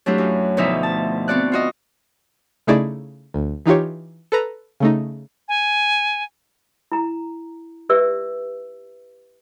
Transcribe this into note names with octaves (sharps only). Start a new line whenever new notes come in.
F#3 A3 D4 E4 F4 G4
F#2
D2 B2 F3 D#4 E4 E5
A5
B3 C4 F#4 D5 F#6
F4 F#4 D#5
C#3 A3 D#4 E4 G#4 D5
D2
E3 D#4 F4 G4 C#5
A4 B4 A#5
C#3 A3 D#4
G#5
E4 A#5
G4 B4 D5 E5 E6